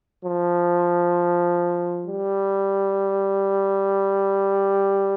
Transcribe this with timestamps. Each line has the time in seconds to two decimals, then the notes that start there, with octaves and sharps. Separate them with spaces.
0.23 F3
2.07 G3